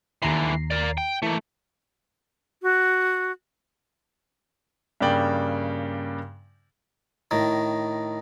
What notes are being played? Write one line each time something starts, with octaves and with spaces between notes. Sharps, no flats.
D#2 D3 E3 A#5 C7
A#4 D5
G5
E3 A3 A#3
F#4
G2 C#3 A#3 D5 G5 F#7
A2 D#3